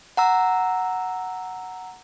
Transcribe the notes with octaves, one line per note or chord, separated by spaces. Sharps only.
F#5 A#5 E6